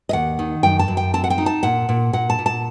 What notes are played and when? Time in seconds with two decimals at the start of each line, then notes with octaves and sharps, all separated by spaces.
0.09 D#5
0.13 D#2 F#5
0.39 D#3
0.63 F#2 G5
0.79 A5
0.88 F#2
0.97 G5
1.14 C4 A5
1.24 F#5
1.30 G5
1.38 D#4
1.46 A5
1.63 A#2 F#5
1.89 A#2
2.13 A#2 F#5
2.30 A5
2.39 A#2
2.46 A5